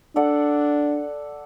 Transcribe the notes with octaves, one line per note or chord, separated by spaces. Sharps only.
D4 A4 D5 F#5